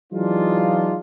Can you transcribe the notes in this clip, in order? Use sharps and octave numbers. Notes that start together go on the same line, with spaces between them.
E3 F#3 G#3 D4 D#4 F4